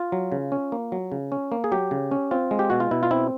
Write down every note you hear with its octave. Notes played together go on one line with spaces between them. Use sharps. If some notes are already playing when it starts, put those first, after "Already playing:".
Already playing: F4
F#3
C#3
C#4
A#3
F#3
C#3
C#4
A#3
G#4
F#3 G4
C#3
C#4
C4 F4
G#3
G4
B2 F#4
F4
B2 E4
F4
C4 E4